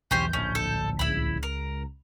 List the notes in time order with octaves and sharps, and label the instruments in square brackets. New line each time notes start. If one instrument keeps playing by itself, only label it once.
[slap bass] B1 E2 E3 [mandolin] C#4 G4 C5 [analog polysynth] G6
[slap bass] D1 A#1 D3 [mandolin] C#4
[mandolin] A4
[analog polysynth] C#2 [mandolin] E4 B5
[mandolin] A#4